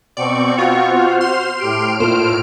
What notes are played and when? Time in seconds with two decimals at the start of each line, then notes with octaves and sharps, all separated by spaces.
0.17 B2 C4 D5 C#6
0.58 F4 F#4
0.90 C5 F6
1.21 C6
1.59 A2 G4 F6 D7
2.00 A#2 A4 C5